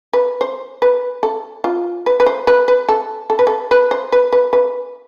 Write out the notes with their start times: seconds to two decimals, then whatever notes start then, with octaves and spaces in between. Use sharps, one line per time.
0.13 B4
0.41 C5
0.82 B4
1.23 A4
1.64 F4
2.06 B4
2.20 B4
2.26 C5
2.47 B4
2.68 B4
2.89 A4
3.30 A4
3.39 B4
3.47 A4
3.71 B4
3.91 C5
4.12 B4
4.32 B4
4.53 B4